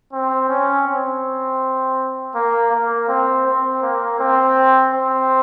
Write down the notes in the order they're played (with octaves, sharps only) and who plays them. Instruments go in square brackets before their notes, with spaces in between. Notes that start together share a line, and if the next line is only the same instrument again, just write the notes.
[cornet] C4
C#4
C4
A#3
A#3
C4
C4
A#3
C4
C4